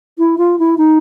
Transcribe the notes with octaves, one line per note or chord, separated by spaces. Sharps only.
E4
F4
E4
D#4